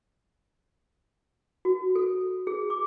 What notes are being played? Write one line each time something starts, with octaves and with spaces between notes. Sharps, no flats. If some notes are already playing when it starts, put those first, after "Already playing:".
F#4
A4
G#4
D6